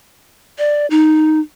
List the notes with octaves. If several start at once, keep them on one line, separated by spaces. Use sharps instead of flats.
D5
D#4